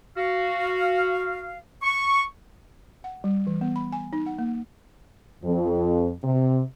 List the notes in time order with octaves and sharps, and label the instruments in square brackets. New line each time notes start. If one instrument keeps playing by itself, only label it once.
[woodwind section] F#4 F5
C#6
[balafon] F#5
G3
E3
B3
B5
G#5
D#4
F#5
A#3
[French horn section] F2
C3